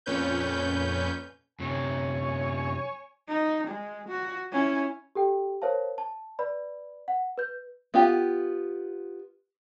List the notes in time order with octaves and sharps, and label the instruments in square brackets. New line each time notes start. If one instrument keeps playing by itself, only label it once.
[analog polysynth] F2 A#2 C#4 B4 G6
[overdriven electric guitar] F#2 C3 [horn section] C#5 G#5
[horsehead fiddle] D#4
G#3
F#4
C#4 E4
[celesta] G4 A4 G5
A#4 C5 C#5 F5 A5
A5
B4 D5 B5
F#5
B4 G6
[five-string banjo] B3 F4 G4